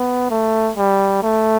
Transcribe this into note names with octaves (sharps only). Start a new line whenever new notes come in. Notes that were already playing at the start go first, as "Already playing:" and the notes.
Already playing: B3
A3
G3
A3